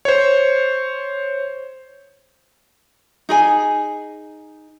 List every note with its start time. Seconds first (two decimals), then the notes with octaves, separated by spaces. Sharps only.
0.05 C5 C#5
3.29 D#4 G#4 G#5